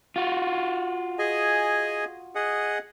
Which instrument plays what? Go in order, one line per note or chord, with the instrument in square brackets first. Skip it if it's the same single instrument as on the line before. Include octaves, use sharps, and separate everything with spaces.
[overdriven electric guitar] F4 F#4
[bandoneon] G#4 D#5 G#5
G#4 D#5 F#5